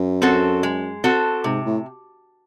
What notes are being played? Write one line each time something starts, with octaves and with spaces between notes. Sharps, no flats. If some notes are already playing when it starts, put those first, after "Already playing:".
Already playing: F#2
C4 F#4 A4
G#3
C4 F#4 A4
G#2 C3
A2